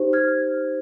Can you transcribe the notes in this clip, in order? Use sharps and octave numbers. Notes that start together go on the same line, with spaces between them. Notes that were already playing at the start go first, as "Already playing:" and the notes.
Already playing: D#4 G4 C5
F6 G#6